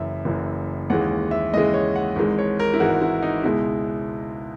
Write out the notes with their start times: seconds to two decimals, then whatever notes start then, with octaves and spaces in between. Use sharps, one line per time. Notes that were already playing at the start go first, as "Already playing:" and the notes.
Already playing: F#1 F#2 E3 E5
0.25 F#1 F#2 E3
0.90 D#2 C#3 E3 G#3 F#5
1.31 E5
1.53 D#2 C#3 E3 G#3 D#5
1.74 C#5
1.96 F#5
2.16 G#1 G#2 E3 G#3
2.38 C#5
2.60 A#4
2.73 E4
2.80 G#1 G#2 E3 G#3 F#4
3.02 E4
3.22 D#4
3.44 C#2 B2 G#3 E4